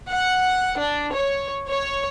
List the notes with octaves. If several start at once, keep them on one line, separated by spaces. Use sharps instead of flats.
F#5
D4
C#5
C#5